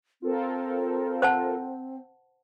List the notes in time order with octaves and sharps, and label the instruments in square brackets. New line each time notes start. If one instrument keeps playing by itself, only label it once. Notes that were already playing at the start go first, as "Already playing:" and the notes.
[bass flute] C4 [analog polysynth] F4 A4 A#4
[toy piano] C5 F#5 A5